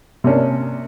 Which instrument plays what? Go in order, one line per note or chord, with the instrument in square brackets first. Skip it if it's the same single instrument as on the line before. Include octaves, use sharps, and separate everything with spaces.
[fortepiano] C3 A#3 C#4 D4